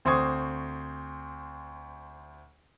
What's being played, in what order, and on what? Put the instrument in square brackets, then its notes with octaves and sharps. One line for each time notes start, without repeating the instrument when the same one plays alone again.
[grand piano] D2 C4 C6 C#6 D#6 G#6